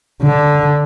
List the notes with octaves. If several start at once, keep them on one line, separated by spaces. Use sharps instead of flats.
D3